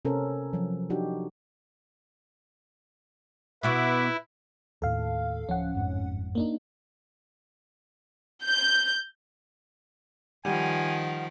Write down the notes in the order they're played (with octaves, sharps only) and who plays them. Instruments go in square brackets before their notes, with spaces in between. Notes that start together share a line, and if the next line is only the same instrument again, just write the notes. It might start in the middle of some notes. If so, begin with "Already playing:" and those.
[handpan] C3 C#4 A4 A#4 C5
F3 F#3
D4 D#4 F#4 G4
[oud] B2 B3 F#4 [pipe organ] E4 [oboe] B4 [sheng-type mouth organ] E5 F#5 D6
[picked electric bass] D#2 A2 [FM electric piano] A4 F5
[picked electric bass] D1 F3 [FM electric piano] C#4 F#5
[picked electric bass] G1 F2 G#2
[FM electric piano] A#3 D4 D#4
[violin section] G6
[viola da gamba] D#3 F3 [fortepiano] G3 [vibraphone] F#5 [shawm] G#5